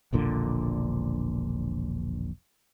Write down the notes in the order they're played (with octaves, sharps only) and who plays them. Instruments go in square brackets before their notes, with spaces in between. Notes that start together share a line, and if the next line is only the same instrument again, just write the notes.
[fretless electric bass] E1 A#1 A#2 D3